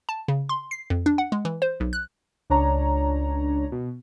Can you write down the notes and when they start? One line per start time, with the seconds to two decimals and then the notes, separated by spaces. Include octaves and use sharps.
0.09 A5
0.28 C#3
0.49 C6
0.71 C7
0.90 F2
1.06 D4
1.18 F#5
1.32 G#3
1.45 E3
1.62 C5
1.80 B1
1.93 F#6
2.50 C#2 D4 C#5 A#5
3.72 B2